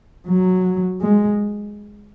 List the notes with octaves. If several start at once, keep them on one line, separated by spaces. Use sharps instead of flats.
F#3
G#3